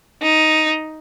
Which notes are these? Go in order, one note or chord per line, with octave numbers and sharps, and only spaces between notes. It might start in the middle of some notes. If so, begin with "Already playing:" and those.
D#4